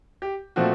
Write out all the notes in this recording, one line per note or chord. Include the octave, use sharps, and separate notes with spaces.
G4
A#2 F3 A3 C4 F#4